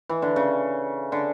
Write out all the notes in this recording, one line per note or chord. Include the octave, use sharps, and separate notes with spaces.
E3
D3
C#3
D3